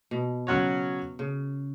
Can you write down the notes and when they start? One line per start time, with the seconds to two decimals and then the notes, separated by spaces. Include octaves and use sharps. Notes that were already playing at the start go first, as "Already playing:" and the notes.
0.11 B2
0.47 C#3 F#3 C#4 F#4 C#5
1.19 C#3